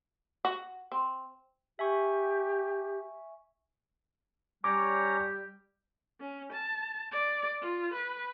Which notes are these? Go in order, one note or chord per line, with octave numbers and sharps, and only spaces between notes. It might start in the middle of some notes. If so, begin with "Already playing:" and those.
F#4
C4
G4 E5 G#5 C#6
G3 C#4 G4 C#5 A#5 D6
C#4
A5
D5
F4
B4